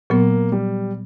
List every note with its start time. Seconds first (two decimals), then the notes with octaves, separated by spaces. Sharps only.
0.10 A#2 F#3 A#3 B3
0.52 G3